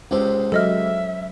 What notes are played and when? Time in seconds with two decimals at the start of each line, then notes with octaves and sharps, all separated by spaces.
0.11 C#2 C3 G#3 C#4 C5
0.52 F#3 A4 D#5 E5 F6